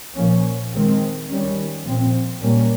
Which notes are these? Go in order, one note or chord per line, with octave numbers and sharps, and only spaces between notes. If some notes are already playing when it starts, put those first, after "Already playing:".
A#2 F3 A#3 C#4
D#3 G#3 C4
D#3 G3 C#4
A#2 F3 C4
A#2 G3 A#3 C#4